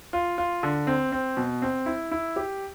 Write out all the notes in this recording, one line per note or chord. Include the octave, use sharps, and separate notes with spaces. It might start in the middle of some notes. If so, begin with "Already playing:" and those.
F4
F4
D3
C4
C4
B2
C4
E4
E4
G4